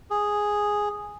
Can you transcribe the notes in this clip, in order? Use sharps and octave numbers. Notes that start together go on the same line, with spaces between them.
G#4